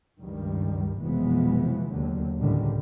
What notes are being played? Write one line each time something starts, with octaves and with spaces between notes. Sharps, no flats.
C#2 G2 D#3 G3
F1 B2 E3 F3 G#3 B3
D#2 D3 F#3
C#2 A2 D3 D#3 G3